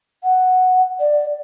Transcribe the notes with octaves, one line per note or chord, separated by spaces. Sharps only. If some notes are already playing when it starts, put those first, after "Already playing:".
F#5
D5